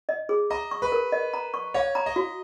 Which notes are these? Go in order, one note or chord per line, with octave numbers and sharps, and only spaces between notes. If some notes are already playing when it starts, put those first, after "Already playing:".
D#5
G#4
D#5 A#5
C#6
B4
A#4
D#5
A#5
C#6
C#5 F5
A#5
D#5
F#4